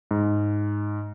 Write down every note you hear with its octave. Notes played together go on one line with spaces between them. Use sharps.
G#2